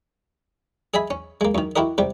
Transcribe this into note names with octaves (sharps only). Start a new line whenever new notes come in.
G#4 D#5 E5 G#5 B5
C#4
G#3 A#3
F#2 D#3
E4 F#4 G4 A#4 D#5
C3 G3 G4